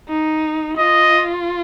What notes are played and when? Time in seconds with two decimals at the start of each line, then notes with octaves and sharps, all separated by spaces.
0.09 D#4
0.78 F4 D#5